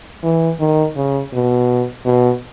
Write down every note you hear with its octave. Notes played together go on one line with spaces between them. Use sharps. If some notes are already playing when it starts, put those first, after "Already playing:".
E3
D#3
C#3
B2
B2